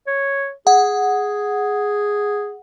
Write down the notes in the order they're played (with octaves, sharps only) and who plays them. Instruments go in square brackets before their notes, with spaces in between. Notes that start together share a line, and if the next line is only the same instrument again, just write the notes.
[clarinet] C#5
[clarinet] G#4 [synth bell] F#5